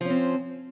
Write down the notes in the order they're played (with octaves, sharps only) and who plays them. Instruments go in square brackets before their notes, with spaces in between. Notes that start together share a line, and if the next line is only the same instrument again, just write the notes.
[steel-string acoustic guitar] F3
C#4
C4